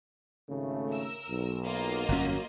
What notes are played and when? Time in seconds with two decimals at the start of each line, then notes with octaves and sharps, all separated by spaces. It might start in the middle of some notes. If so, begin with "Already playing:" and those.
0.50 G#1 C#3 A3
0.90 A#4 E6
1.29 B1
1.65 A#3 F4 D#5
2.09 G1 F2 F#3 C#4